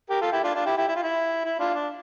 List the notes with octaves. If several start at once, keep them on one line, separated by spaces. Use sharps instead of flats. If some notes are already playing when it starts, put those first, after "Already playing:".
G4 A#4
F4 A4
E4 G4
D4 F4
D4 F4
E4 G4
E4 G4
E4
F4
E4
E4
D4 F4
D4